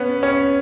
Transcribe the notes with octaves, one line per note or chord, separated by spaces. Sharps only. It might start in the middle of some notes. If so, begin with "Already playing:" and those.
Already playing: B3 C#4
C#4